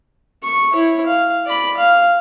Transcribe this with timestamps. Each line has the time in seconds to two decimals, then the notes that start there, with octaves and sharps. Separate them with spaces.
0.44 C#6
0.72 E4 C#5
1.07 F5
1.46 D5 B5
1.77 F5